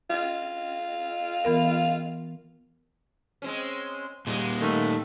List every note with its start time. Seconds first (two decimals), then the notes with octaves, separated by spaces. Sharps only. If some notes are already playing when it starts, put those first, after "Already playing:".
0.10 F4
1.45 E3 B3 A#4
3.42 G#3 C4 C#4
4.27 A#2 G3 G#3
4.60 D#3 A3